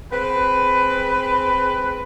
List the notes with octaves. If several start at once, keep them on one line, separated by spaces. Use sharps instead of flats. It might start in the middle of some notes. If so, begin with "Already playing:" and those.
C4 G#4 B4